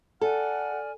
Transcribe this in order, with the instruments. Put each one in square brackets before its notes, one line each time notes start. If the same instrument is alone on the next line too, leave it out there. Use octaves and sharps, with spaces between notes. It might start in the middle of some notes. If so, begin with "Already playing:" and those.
[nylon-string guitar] A4 [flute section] D5 G#5 F6 [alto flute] F#5